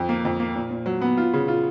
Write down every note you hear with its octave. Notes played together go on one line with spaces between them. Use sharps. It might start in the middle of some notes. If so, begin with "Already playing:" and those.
Already playing: F2
A#3
F2
A#3
A#2
A#2
F#3
B3
F4
C#3
F4